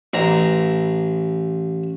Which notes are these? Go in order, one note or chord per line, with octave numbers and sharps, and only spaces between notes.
A1 A#5